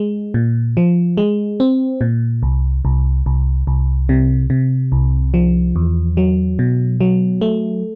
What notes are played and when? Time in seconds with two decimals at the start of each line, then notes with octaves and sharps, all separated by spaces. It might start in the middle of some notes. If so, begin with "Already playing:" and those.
Already playing: G#3
0.34 A#2
0.77 F3
1.17 G#3
1.60 C4
2.01 A#2
2.43 C2
2.85 C2
3.26 C2
3.67 C2
4.09 C3
4.50 C3
4.92 C2
5.34 F3
5.76 E2
6.17 F#3
6.59 B2
7.01 F#3
7.41 A3